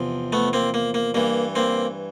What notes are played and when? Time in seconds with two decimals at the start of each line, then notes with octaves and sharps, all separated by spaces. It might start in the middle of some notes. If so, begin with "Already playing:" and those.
Already playing: E2 C3 F3
0.33 A3 B3
0.53 A#3 C4
0.74 A#3
0.94 A#3
1.14 G2 E3 A#3
1.55 A#3 C4